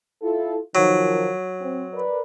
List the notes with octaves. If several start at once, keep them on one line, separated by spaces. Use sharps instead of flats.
E4 F4 A4
D#3 F3 F#3
C4
A#4 B4 D5